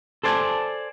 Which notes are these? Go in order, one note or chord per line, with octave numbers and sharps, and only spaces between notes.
A4 C5 D5 G#5 A5